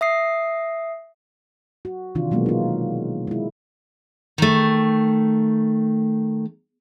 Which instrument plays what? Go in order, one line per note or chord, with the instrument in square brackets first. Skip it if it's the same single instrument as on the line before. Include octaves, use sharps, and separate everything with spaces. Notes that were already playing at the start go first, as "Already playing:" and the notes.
[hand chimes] E5 D#6 C7
[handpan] F#4
C3 D#3 E3 D4 F4
B2 F#3 G#3 A#3 B3
D#4 F4
G#3 E4
[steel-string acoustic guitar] D#3 A3